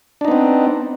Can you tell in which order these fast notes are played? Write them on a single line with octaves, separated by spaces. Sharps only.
D4 D#4 B3 C4